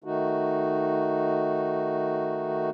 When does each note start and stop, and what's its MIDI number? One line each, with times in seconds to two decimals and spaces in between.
0.04 2.70 51
0.04 2.70 57
0.04 2.70 63
0.04 2.70 66